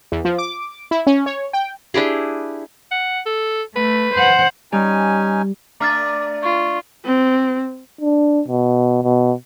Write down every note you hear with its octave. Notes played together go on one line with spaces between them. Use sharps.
E2
F3
D6
E4
C#4
C#5
G5
D4 E4 G4 G#4
F#5
A4
A3 B4
C5 F#5
G3 C#4 D#4 G#5
A3 D4 E5 A#5 D6 F6 A6
F4 C#6
C4
D4
B2
B2